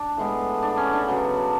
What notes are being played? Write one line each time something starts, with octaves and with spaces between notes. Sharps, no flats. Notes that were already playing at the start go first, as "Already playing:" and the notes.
Already playing: D4
A2 G#3 B3
D4
C#4
D4
C#3 F#3 B3